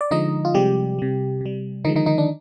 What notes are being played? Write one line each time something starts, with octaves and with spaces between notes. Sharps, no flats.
D5
D3 F3 G#3 D#4 D#5
F4
C3 F3 G3 G#3 G4
C3 G3
C3 G3
D3 D#3 F3 G#3 D#4
D#3 D#4
D#3 D#4
D4